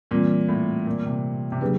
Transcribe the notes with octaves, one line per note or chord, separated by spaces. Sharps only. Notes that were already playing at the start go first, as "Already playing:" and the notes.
A#2 E3 G3 C4 F4
A2
A#2
C3
C3
C#3 F#3 A#3 D4 G4 B4